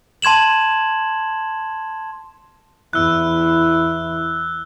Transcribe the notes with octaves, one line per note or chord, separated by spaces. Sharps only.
A5 C6 G#6 E7 F#7
E2 E4 E6 F#6